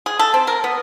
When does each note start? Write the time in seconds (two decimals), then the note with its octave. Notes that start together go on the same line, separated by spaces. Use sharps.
0.06 G#4
0.19 A4
0.34 C4
0.47 A#4
0.64 B3